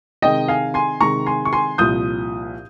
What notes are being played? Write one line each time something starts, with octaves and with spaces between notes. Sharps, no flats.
C3 D#3 G#3 D#5 G5
F5 G#5
G#5 C6
C3 D#3 G#3 A#5 C#6
G#5 C6
C#6
G#5 C6
C2 A#2 F3 D#6 G6